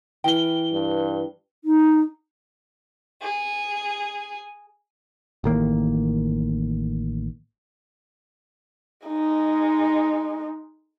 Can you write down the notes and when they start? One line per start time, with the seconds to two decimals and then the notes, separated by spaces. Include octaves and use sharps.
0.24 E3 A#4 B4 G5 G7
0.73 G2
1.65 D#4
3.22 G#4
5.44 A1 D#3 A#3
9.07 G#3 D#4